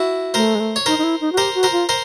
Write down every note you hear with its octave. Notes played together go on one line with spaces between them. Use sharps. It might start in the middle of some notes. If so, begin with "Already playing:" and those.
Already playing: E4 F#4
A3 A#4 C5
G#3
A3
C#5
D#4 A#4 C5
D#4
E4
D#4
F#4
G4 A#4 C5
F#4
A#4 C5
F4
A#4 C5